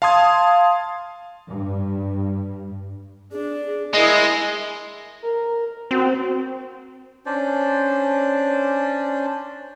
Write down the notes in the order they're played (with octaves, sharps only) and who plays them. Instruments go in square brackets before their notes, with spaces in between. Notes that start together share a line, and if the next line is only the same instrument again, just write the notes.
[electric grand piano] F5 A5 C6 D#6 G#6
[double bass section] G2
[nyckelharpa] D4 [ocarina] G#4
[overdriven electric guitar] G#3 [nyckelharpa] E4 A#4 [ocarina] G#4 [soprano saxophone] D#5
[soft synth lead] A#4
[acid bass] C4 [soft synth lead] F#4
[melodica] C#4 D4 C5 D5